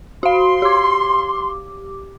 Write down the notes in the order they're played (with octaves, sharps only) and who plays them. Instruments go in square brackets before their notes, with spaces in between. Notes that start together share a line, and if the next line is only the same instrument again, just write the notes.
[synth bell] F#4 F5 [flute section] C6
[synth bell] G4 D6